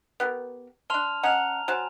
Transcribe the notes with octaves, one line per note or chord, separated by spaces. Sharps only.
B3 G4 A#4
D4 A5 C6 F6 F7
C#4 D#5 F#5 A#5 F7
F#3 C5 G#5 A5